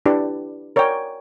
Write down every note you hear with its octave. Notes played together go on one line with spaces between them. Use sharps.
D4 E4 G4 B4 D5
A#4 C#5 D5 F#5 G5